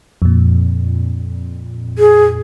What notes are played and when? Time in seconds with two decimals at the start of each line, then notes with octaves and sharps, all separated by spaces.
0.22 F2 A#2
1.98 G#4